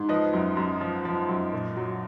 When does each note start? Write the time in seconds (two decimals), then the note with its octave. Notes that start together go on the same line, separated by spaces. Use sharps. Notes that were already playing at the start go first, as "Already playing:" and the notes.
Already playing: G#2
0.09 F3 B4 D#5
0.33 F#2
0.57 F#2
0.81 F3
1.05 F3
1.29 F#2
1.53 A#2
1.77 F#3